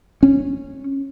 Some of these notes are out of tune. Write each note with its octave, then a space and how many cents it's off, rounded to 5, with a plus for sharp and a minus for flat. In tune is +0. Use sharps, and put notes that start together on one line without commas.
C#4 -15